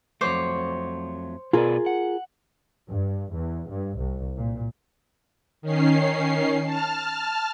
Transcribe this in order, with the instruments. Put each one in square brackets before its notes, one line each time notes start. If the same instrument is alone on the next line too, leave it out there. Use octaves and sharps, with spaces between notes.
[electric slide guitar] F2 F#3 A3 [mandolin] C5 C#5 D6
[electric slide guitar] B2 B4 D5 [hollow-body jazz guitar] F4 G#4 A#4
[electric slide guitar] F#5
[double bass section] G2
E2
G2
C2
A#2
[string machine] D#3 C#4 C7
A5 F6